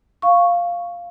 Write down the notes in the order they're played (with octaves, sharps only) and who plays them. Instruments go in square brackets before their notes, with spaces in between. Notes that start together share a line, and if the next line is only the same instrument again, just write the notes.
[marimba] F5 C#6